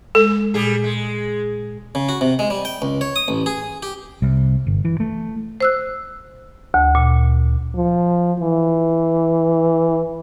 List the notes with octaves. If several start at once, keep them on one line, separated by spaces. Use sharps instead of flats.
G#3 A4
A#2 G3 G#4
G#3
C#3
F#4
C3
G#3
G3
G5
C#2
C#5
D#6
A1
G#4
G4
C2
G1
E3
A3
C5 E6 F#6
D2
A#2
F3
E3